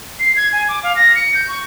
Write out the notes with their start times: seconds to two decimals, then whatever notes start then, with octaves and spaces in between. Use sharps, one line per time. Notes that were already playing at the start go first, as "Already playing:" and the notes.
0.20 C7
0.36 G#6
0.53 G#5
0.68 D6
0.83 F5
0.96 A#6
1.15 C#7
1.34 G6
1.48 C#6